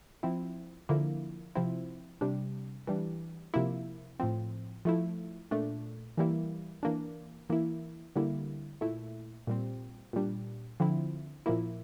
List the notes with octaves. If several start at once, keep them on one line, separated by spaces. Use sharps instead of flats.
F3 C4 E4
D3 F3 A#3 E4
C3 F3 C4 E4
C3 G3 D4
E3 G3 D4
C3 F3 A#3 E4
A2 F3 C4
F3 A3 E4
A#2 A3 D4
E3 G3 A#3 E4
E3 A#3 D4
E3 A#3 E4
D3 G3 A#3 E4
A#2 A3 E4
A#2 G3 C4
A#2 G3 D4
D3 F3 C4 E4
A#2 F3 A#3 E4